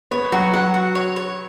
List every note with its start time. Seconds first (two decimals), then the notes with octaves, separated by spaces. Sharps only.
0.11 B3 C#5
0.32 F#3 F#4
0.53 F#3 F#5
0.74 F#4
0.95 C#5
1.16 C#5